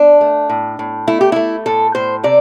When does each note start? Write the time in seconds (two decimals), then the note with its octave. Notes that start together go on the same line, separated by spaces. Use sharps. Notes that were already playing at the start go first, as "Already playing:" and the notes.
Already playing: D4
0.21 A3
0.50 A2
0.79 A2
1.07 A3 E4
1.21 G4
1.32 A3 E4
1.66 A2 A4
1.95 A2 C5
2.24 C3 D5